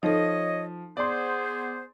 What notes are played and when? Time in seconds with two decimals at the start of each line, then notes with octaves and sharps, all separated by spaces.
0.03 F3 D#4 A4 C#5 D#5
0.97 B3 G#4 C5 D5 C6